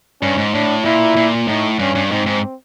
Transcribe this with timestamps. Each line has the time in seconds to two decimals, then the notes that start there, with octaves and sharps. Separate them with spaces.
0.22 G2 C#4
0.37 G#2
0.53 A2 D4
0.85 A#2 E4
1.17 A#2
1.47 A2 D#4
1.79 G2 C#4
1.95 G2
2.11 G#2 C4
2.26 G#2